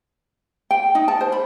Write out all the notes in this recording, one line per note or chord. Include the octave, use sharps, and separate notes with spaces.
G5
D#4
A5
C5
B5